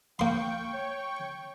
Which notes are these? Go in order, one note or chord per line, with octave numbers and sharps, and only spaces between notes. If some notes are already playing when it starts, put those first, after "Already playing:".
A#3 F5 G5 C6 C#6
C#5